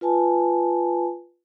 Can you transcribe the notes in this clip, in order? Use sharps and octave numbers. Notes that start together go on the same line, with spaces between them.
F4 B4 G#5 A5